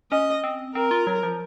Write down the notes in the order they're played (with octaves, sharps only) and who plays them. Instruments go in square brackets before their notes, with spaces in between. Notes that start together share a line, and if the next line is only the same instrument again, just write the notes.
[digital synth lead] C#4 [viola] D#5
[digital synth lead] C4
[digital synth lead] C4 [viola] A#4
[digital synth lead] F4
F#3
F3